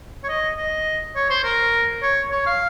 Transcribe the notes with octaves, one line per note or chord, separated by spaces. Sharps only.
C#5
D#5
D#5
C#5
C5
A#4
C#5
C#5
F5